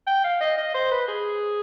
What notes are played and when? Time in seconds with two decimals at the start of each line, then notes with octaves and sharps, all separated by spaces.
0.07 G5
0.24 F5
0.41 D#5
0.58 D#5
0.74 C5
0.92 B4
1.08 G#4